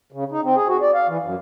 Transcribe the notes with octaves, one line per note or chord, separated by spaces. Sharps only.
C#3
D#4
C4
G#4
F#4
D5
F5
E3
F#2